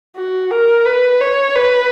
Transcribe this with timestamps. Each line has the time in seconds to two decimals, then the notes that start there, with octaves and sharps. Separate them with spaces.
0.17 F#4
0.51 A#4
0.85 B4
1.20 C#5
1.55 B4